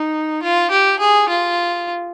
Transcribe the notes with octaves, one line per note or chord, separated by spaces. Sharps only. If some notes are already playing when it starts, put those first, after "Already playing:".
Already playing: D#4
F4
G4
G#4
F4